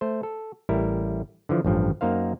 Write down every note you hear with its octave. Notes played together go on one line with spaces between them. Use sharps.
A3 C5
A4
A1 G3 E4 A#4
D3 E3 F3
A1 G2 F3
F#2 A#3 D#4 C5 F5